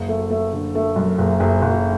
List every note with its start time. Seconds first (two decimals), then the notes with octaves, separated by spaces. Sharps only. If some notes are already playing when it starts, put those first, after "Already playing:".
Already playing: F#1
0.09 A3
0.30 A3
0.53 D3
0.75 A3
0.96 F#2
1.18 F#1
1.40 F#1
1.62 F#1